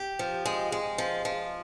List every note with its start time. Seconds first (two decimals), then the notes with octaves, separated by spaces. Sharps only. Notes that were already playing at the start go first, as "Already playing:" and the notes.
Already playing: G4
0.19 F3
0.46 G#3
0.72 G#3
0.98 F3
1.25 F3